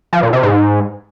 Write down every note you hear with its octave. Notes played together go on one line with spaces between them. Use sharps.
F3
A#2
C3
G#2